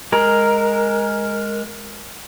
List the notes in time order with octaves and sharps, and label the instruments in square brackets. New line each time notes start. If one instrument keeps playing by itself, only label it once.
[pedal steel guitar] G#3 A#4